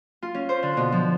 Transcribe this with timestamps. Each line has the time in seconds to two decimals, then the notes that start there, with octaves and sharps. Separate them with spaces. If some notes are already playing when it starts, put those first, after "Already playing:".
0.22 F4
0.35 C#4
0.49 C5
0.63 D3
0.77 B2
0.92 F3